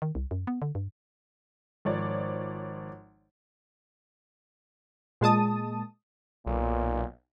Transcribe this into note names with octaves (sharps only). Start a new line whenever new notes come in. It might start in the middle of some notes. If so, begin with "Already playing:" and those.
D#3
C2
F#2
B3
D3
G2
G#1 F3 C#5 D5
A#2 G#3 A5 D#6
B1 A#2